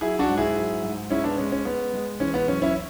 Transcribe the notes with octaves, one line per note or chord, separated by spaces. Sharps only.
F#3 E4 G#4
D4 F#4
G#2
E4 G#4
F#3
G#2
G#3 C#4 E4
B3 D4
G#3 C#4
C#4
G#3 B3
G#3
E3 C#4
B3
F#2 C#4
C#4 E4